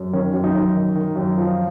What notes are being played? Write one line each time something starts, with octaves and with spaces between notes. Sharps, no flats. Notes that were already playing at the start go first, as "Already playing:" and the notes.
Already playing: F#2
D#3 C#4
F#2
D#4
F#2
D#3
D#3
F#2
F3